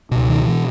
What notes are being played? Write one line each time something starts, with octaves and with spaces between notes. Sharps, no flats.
C#2 B2
D#3
B2 E3